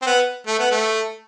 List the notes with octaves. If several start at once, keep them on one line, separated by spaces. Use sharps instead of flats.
C4
B3
A3
B3
A3